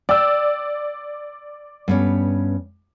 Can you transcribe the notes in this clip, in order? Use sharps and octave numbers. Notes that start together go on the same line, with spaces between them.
D5 G5 E6
G2 B3 C#4